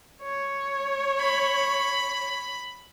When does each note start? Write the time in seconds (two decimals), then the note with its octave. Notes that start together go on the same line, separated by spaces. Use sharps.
0.22 C#5
1.19 B5